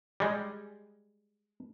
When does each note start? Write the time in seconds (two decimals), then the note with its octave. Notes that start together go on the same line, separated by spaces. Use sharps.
0.20 G3 G#3